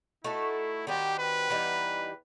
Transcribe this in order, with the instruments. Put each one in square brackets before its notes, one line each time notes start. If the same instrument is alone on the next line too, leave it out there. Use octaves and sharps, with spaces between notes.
[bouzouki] A3 D#4 F#4 A4 [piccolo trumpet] E4
[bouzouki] D#3 G3 C4 F#4 [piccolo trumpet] G4
[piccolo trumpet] B4
[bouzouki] E3 G3 B3 D#4